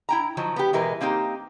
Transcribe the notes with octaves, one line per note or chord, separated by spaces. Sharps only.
E4 G5 A#5
D#3 F3 F#3
B3 G4
B2 E3 G#3 A#4 B4
A#3 C4 D#4 G4